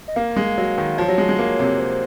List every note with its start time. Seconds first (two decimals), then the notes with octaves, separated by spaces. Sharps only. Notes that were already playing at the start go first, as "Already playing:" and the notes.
0.08 D#5
0.16 A#3 F5
0.36 G#3
0.58 F#3
0.78 D#3
0.98 F3 C#5
1.08 F#3
1.18 G#3
1.29 G#3
1.39 A#3
1.59 C3
1.79 C5